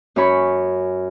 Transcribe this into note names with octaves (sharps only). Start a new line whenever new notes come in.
F#2 C#4 C#5 B5 C#6